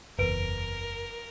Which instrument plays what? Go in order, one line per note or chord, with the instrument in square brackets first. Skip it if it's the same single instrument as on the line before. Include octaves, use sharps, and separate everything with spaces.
[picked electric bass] F#1 E2 [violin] A#4 [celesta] B4 D7